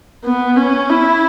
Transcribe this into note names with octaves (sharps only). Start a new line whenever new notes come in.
B3
C#4
E4